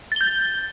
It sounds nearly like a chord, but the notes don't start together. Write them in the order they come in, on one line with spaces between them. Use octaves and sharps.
A6 G7 G6